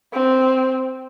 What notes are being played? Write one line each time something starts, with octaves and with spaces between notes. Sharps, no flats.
C4